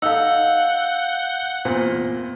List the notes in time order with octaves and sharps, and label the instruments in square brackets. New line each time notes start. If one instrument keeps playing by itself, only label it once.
[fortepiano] D#4 A4 [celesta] F5 E6 [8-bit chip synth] F#5 G6
[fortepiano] E2 A#2 C4